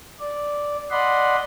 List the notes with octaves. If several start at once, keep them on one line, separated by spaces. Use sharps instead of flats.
D5
D5 D#5 F#5 B5 C6